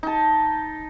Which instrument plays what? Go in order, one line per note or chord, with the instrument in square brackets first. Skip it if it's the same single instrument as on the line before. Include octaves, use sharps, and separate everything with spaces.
[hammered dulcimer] D#4 A5